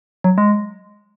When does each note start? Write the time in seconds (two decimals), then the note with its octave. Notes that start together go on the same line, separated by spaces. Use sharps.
0.24 F#3
0.38 G#3